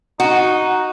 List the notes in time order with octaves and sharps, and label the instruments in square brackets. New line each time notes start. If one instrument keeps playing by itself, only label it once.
[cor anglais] D#4 [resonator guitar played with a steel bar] F#4